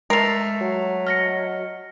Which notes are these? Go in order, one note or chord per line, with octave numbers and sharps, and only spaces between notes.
G#3 A3 A#4 A#6 C7 F7
F#3
D#5 F6 A#6 C#7